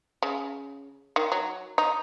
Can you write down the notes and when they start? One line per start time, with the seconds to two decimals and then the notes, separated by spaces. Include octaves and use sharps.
0.22 C#3
1.16 D#3
1.32 F#3
1.78 D#4